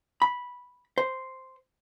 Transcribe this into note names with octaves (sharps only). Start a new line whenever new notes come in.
B5
C5